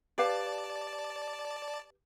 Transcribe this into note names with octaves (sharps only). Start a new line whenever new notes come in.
G4 B4 D5 F5 A5